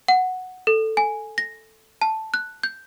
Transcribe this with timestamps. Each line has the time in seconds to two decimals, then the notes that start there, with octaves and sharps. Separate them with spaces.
0.08 F#5
0.67 A4
0.97 G#5
1.38 A#6
2.02 A5
2.34 F#6
2.63 G6